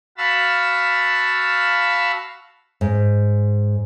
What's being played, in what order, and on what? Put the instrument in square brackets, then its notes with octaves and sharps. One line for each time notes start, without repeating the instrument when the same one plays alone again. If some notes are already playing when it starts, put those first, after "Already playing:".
[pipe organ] F#4 F5 A5 B5 E6
[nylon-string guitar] G#2